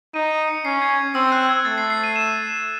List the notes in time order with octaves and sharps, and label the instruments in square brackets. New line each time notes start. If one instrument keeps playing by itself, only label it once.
[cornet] D#4 [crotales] D#7
[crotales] D#7
C#7
[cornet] C#4 [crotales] C7
[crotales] G#6
[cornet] C4 [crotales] E6
[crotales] F#6
G#6
[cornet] A3 [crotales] A6
[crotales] C7
C7
D#7
E7